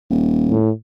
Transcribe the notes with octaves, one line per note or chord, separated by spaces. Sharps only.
D#1
A2